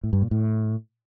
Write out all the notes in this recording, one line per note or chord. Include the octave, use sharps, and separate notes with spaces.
A2
G2
A#2
A2